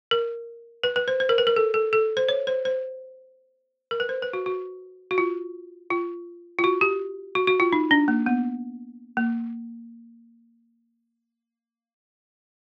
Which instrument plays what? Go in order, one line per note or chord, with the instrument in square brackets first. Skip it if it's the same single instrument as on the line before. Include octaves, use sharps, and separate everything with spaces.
[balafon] A#4
B4
B4
C5
C5
A#4
B4
A#4
A4
A4
A4
C5
C#5
C5
C5
A#4
B4
C5
B4
F#4
F#4
F#4
F4
F4
F4
F#4
G4
F#4
F#4
F4
D#4
D4
A#3
B3
A#3